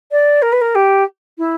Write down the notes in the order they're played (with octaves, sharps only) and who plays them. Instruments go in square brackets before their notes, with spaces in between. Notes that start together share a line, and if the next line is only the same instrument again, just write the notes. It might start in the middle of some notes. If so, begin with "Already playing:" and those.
[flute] D5
A#4
B4
A#4
G4
E4